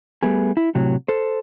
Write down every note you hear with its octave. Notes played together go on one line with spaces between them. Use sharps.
G3 A3 B3 G#4
E4
A2 C3 F#3
A4 C5